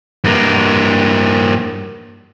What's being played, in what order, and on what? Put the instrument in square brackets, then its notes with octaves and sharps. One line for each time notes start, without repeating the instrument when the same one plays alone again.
[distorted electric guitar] G2 A#3